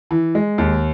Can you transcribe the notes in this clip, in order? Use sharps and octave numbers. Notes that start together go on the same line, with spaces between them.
E3
G#3
D#2